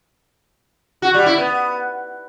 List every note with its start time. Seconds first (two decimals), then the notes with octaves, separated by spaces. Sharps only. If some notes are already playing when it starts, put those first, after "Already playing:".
1.02 F#4
1.14 G3
1.26 E4
1.38 B3